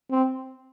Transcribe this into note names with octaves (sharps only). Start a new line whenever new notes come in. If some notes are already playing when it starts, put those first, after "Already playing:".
C4